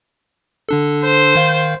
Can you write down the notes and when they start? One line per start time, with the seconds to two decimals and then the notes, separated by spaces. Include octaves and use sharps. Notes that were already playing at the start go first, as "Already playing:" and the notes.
0.69 D3 D4 A4
1.04 C5
1.36 D#3 F5 G6